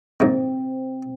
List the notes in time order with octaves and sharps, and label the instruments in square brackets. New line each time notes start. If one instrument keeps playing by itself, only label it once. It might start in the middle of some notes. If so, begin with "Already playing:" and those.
[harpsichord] A#1 G#2 D#3 [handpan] C4